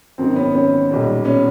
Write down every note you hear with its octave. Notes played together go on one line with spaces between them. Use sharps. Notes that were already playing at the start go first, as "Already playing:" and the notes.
G#1 F#2 D#3 C4
B3 C#4
B3 C#4
B1 A#2 G3
B3 C#4